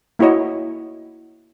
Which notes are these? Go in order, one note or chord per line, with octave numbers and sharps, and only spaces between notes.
A#3 E4 F#4 C#5 D#5